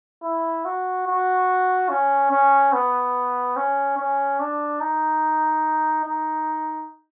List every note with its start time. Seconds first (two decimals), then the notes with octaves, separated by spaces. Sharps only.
0.23 E4
0.65 F#4
1.08 F#4
1.90 C#4
2.31 C#4
2.73 B3
3.57 C#4
3.98 C#4
4.40 D4
4.80 D#4
6.05 D#4